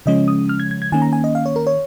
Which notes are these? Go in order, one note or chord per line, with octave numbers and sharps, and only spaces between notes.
C#3 F3 G#3 C#4 D#5
D#6
F6
G#6
G#6
G#6
D#3 A#3 C#4 G#5
A#5
G#5
D#5
F5
C#5
A#4
C#5